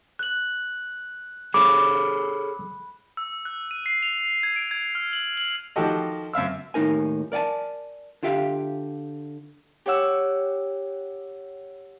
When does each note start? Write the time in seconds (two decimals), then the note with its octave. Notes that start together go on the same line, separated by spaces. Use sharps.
0.19 F#6 F#7
1.54 G#4 A4 C#5 B5 D6
3.17 E6
3.45 F#6
3.71 D#7
3.86 C7
4.03 F7
4.43 G#6
4.56 D7
4.71 G#6
4.95 F6
5.13 F#7
5.37 F#7
5.76 D#3 F3 F#4 G4 A4 D#5
6.33 F#2 E5 F5 E6
6.74 D#2 A2 D#4 A#4 G#5
7.32 A#4 D5 F5 G#5 A5
8.23 D3 F4 G4 E5 F5
9.86 G4 C#5 F#5 E6